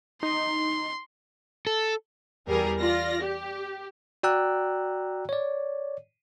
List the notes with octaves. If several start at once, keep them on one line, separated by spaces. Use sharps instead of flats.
D#4 C6
A4
E2 G3 G#4 A#4
F4 D5 A#6
G4
F#4 D5 G5 A#5 E6 F#6
C#5 D5